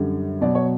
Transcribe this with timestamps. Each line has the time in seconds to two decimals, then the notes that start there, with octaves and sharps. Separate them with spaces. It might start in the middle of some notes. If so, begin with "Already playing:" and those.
Already playing: F#2 D3 G3
0.41 B2 F#3 D5
0.55 C#5